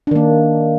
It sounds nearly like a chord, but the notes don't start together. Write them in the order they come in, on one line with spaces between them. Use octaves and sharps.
D4 D#3 A#3